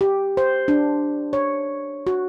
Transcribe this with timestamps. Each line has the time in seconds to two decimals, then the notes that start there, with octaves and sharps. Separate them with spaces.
0.01 G4
0.37 C5
0.68 D4
1.33 C#5
2.07 F#4